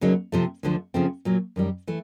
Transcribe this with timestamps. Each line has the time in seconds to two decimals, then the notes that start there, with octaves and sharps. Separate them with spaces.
0.01 D2 C#3 F#3 A#3 D#4
0.32 C3 F3 A3
0.63 D2 D3 F3 A3
0.94 C#3 F3 A3 C4
1.25 A#2 F#3 A#3
1.56 F#2 D#3 G3
1.87 E3 A3